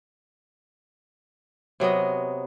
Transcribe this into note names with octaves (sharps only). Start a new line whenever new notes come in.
C3 F#3 B3 D#5